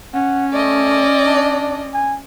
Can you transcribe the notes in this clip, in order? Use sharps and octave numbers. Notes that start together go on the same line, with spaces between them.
C#4 F#5
A3 D5 D#5
D4
G#5